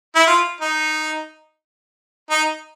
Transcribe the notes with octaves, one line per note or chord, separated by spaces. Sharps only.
E4
F4
D#4
D#4